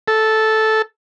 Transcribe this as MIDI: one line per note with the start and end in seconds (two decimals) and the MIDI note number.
0.08 0.82 69